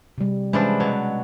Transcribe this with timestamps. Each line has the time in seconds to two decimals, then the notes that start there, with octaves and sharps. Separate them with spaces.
0.18 C3 G3
0.53 E3 F3 G#3 C#4 D4
0.80 B2 F#3